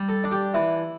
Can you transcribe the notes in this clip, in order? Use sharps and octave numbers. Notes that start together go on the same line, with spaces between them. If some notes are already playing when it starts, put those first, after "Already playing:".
Already playing: G3
A4
D4
G4
E3 E4